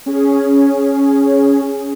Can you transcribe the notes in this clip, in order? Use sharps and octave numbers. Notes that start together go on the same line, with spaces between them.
C#4 G#4